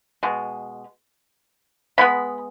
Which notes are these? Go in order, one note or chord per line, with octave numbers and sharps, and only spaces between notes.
B2 G#3
B2 G#3 B3 B5